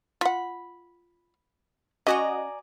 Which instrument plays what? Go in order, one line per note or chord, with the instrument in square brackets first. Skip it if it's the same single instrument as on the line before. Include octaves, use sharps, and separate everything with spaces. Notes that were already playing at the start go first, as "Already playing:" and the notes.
[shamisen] F4 F#5 [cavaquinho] B5
[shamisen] C#4 [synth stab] F#4 D#5 [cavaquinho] D5 G#5 A#5